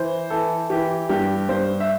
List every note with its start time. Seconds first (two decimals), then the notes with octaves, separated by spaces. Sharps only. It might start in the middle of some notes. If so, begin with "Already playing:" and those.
Already playing: E3 C5
0.30 E3 A4
0.70 E3 G4
1.09 G2 G4
1.49 G2 C5
1.80 E5